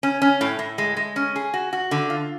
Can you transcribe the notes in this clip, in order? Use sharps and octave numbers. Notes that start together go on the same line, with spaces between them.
C#4
C#4
A2
A2
G#3
G#3
C#4
G#4
F#4
F#4
D3
F4